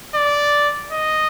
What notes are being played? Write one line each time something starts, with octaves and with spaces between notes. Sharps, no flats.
D5
D#5